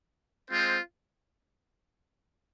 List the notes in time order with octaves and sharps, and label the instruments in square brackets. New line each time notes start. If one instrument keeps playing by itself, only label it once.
[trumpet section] G#3 C4 F4 C5